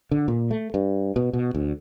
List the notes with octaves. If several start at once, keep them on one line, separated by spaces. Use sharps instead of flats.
D3
A#2
A3
G2
B2
B2
D2